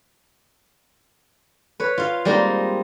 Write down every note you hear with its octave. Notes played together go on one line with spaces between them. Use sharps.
B4 C#5
F4 F5
G3 G#3 A#3 C4 D#4